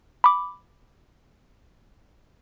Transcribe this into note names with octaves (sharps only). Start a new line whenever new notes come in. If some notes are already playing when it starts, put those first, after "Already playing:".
B5 D6